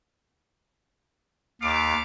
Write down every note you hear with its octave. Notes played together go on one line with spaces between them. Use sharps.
D#2 A3 F5 D6